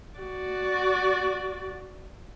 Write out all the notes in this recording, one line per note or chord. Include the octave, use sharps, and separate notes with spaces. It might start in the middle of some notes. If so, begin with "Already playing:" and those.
F#4 D5